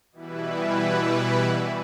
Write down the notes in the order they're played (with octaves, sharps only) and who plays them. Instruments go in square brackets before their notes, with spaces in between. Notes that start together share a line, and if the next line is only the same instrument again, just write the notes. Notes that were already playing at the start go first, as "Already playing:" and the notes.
[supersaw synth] B2 E3 G3 E4 B4